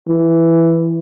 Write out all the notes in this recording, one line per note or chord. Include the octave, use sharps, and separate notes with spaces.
E3